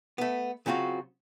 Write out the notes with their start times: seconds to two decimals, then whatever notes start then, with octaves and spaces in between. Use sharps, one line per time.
0.18 A3 B3
0.66 C#3 F#3 C4 F4 F#4